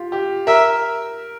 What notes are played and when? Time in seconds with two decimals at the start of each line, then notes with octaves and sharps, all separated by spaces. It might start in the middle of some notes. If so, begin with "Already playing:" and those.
Already playing: F4 G4
0.12 G4
0.47 A#4 E5